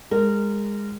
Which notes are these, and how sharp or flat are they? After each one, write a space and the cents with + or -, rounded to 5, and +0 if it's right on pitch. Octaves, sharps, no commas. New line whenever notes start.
G#3 -20 A#4 -20